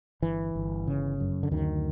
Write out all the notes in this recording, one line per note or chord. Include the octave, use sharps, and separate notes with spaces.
G1 E3
G1
C#3
F#2
D3
D2 D#3